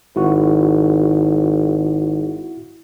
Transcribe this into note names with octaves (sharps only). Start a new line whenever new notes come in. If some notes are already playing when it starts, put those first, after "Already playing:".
G#1 E4 F#4